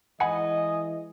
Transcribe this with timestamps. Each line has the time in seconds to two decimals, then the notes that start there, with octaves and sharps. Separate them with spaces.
0.20 E3 G#3 D#5 F#5 G#5 B5